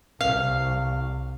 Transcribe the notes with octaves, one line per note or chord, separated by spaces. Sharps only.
C2 F5